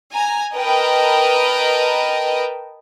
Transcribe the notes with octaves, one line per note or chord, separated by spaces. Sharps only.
G#5 A#5
A#4 B4 D#5 G5 A5